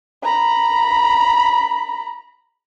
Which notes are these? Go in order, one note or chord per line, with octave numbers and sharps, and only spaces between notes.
A#5 B5